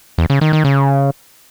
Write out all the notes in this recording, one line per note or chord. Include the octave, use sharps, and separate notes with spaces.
E2
C#3
D#3
D#3
C#3